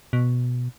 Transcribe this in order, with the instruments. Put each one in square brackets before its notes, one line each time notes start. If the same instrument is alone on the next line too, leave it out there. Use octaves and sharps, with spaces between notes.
[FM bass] B2